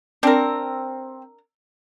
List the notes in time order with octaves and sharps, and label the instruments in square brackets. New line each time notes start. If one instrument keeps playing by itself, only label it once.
[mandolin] C4 [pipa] D4 A#4